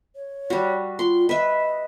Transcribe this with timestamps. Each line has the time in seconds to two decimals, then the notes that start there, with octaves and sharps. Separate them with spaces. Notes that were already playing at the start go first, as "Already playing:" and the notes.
0.16 C#5
0.50 G3 F#4
0.99 F4 C6
1.29 B4 D#5 E5